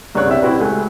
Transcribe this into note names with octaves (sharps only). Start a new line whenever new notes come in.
G1 C2 C#3 D4 C#5 F#6
C4 D4 E5
C4 C#4 E4 F#4 G4 B4
C#2 A3 G#5